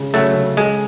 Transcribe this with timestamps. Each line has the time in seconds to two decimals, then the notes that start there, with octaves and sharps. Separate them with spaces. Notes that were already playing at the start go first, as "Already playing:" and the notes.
Already playing: C#3 G#3 C#4
0.14 C#3 F#3 A3
0.36 C#3
0.57 G#3 A4